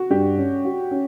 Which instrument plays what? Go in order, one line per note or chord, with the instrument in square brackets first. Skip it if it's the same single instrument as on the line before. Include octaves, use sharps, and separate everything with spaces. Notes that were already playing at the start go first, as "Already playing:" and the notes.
Already playing: [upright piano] F#4
[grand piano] G2 [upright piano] G4
[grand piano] C#4
F#4
C#4